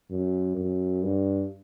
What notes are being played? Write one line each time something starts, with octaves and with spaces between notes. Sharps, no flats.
F#2
F#2
G2